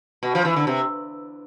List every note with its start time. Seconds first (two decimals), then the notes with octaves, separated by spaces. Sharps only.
0.23 B2
0.35 F3
0.45 E3
0.56 D3
0.67 C3